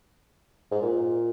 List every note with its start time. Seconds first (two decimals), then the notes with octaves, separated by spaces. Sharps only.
0.71 G#2
0.82 A#2